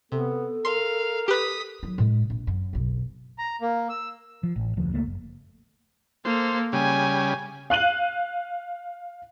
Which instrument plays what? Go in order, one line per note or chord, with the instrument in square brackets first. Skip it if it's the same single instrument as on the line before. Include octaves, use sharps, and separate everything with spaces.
[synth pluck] C3 [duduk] B3 [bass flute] A4
[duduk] A#4 [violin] F5 [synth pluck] C6
[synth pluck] G4 B4 [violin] D#6 B6
[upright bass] F#3 E4
A2 G#3
A#1
F#2
F#1 B1
[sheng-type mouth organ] A#5
A#3
E6
[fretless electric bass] F3
A1
F1 D2 F3
C#2 A3 A#3
F#1
[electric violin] A#3 A4 [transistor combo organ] C5
[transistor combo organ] C#3 G3 [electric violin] G#5
[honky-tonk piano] F5 F#6 D#7 F#7